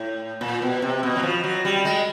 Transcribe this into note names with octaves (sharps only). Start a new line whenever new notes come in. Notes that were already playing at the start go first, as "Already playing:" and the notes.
Already playing: A2
A#2
B2
C3
B2
F#3
F3
F#3
G3
G#3